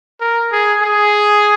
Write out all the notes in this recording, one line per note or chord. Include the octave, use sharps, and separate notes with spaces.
A#4
G#4
G#4